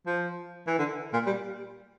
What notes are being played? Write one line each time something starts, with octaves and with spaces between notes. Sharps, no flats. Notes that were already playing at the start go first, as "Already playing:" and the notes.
F3
E3
D3
A#2
G3